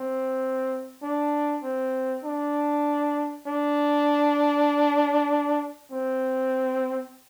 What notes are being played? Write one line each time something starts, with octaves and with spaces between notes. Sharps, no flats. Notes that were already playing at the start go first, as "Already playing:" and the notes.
Already playing: C4
D4
C4
D4
D4
C4